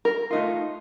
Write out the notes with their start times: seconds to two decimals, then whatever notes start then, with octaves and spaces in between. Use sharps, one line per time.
0.05 A#4
0.31 A3 D#4 F4